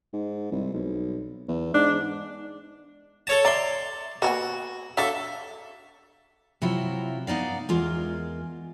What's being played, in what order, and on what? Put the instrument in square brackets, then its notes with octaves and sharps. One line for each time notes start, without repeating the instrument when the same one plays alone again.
[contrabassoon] G#2
C2
B1
E2
[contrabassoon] G#2 [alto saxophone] D4
[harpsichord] A4 C#5 A5
[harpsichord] D5 C6 [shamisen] E5 A#5
[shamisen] A#3 B3 G#5 [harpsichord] F#4
[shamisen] F#3 D4 F5 [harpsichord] A4 E5
[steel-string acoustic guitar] C3 F#3 E4 F4
B3 D#4 D5 F5
E2 G#3 F4 A#4